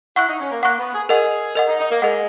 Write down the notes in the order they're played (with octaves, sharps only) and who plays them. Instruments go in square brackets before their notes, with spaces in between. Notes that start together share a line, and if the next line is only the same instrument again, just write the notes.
[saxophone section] E4 [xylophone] F#5 C#6 F#6
[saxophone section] D#4
C#4
A#3
[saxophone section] A#3 [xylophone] F#5 C#6 F#6
[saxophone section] B3
G#4
[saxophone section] G#4 [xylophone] A#4 D#5 F#5
[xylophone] A#4 D#5 F#5
[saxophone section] D#4
D#4
A#3
[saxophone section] G#3 [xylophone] A#4 D#5 F#5